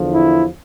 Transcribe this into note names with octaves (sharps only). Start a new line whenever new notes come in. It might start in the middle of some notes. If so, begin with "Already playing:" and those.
Already playing: E2 D3 F3
E4